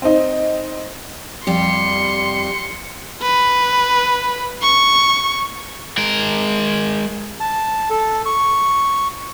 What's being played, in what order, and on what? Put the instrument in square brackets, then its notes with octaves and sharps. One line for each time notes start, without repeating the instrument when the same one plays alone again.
[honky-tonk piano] C4 D#4
[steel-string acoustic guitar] F2 G3 G4 [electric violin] C6 C#7
[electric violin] B4
C#6
[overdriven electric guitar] G#3 A#4
[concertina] A5
A4
C#6